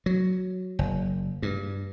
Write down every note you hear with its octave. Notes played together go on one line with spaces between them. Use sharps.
F#3
F#1
G2